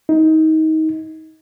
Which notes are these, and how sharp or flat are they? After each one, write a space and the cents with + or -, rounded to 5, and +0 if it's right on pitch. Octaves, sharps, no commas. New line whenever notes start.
D#4 +25